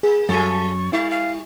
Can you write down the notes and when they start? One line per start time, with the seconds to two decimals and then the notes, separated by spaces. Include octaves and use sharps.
0.03 A#3 G#4
0.29 F#2 F#3 G#4 A4 C#6 A6
0.93 G3 E4 F5
1.11 F5